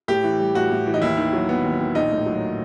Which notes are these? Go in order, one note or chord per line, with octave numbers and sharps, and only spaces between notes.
A2 G4
E3
G3
A2 F#4
A2
E3
D#4
D#2 E4
D#3
F#3
B3
D#2
D#3
A#1 D#4
A2
F#3